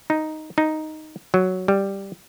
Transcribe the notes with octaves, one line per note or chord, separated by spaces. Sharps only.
D#4
D#4
F#3
G3